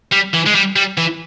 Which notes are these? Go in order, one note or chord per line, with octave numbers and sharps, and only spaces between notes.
G3
E3
G#3
G3
G3
E3